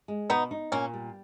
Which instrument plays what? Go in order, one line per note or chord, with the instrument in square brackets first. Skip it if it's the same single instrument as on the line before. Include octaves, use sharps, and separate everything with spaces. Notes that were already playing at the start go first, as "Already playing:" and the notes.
[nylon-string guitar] G#3
[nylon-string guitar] B2 [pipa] B3 D#4
[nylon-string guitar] D#4
[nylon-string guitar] A#2 [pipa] A#3 C#4
[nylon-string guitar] G3